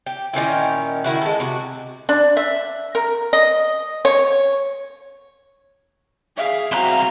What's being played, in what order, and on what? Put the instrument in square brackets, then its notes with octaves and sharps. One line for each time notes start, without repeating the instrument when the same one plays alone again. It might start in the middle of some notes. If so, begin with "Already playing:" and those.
[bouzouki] G4
A#2 D#3 C#4 E4
D#3 E4 F#4
G#3 A4
C3 F#4
[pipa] D4
E5
A#4
D#5
C#5
[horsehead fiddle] G#4 [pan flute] E5 [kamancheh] F5
[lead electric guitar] C2 A#5 [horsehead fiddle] C4 F#4